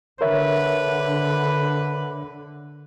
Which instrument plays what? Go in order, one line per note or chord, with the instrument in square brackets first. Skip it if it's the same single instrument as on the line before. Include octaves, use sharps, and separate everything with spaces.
[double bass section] D3 [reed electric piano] A#4 C#5 E5 [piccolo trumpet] B4